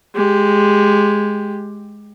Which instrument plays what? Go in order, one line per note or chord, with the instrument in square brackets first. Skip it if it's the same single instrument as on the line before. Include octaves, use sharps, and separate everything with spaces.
[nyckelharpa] G#3 G4